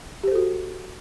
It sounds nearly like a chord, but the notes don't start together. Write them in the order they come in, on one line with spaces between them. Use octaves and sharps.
G4 C5 A4 F#4